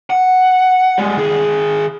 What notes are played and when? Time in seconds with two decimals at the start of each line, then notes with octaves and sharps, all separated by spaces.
0.10 F#5
0.98 G3 G#3
1.17 D#3 G#4